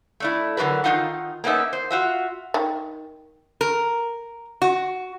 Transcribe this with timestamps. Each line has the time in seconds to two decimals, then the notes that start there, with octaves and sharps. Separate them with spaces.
0.20 A3 D4 E4
0.57 D3 F#3 G4 A#4 B4
0.84 D#3 G3 D#4 F4 F#5
1.44 A#3 B3 C#4 D#4 E5
1.73 C5
1.90 F4 F#4 E5
2.54 D#3
3.61 A#4
4.62 F#4